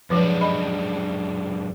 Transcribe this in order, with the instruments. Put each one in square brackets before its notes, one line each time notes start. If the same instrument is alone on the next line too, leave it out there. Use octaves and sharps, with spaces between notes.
[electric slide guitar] F#2 G#3 D4 [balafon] F3 B4
[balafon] D#5 B5